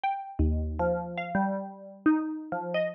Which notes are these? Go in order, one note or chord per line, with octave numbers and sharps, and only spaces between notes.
G5
D#2
F3
F5
G3
D#4
F3
D#5